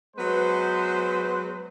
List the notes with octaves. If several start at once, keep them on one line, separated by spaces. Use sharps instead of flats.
F#3 G#3 B3 B4 C5